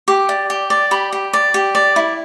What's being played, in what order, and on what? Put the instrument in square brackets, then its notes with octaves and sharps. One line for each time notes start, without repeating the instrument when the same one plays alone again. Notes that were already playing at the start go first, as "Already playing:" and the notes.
[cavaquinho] G4 D6
D5
G4
D5
G4 B5
G4
D5
G4
D5
E4